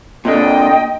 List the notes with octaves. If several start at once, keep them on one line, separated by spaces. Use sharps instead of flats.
A#2 D3 D#5 G5